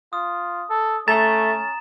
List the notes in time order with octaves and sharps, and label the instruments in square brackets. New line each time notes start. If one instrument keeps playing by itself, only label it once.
[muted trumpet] F4 [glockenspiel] D#6
[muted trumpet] A4
[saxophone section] A3 [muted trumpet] C#4 [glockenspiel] A#5 E7 [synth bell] A6